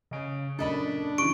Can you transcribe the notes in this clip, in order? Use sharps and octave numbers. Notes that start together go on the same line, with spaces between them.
C#3 D#5 D7
F#2 A#2 D4 A4 D#5 B5
C#3 E3 C#6 D7